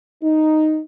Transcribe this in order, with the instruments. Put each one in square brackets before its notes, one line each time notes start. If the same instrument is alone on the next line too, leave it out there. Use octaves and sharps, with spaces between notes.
[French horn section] D#4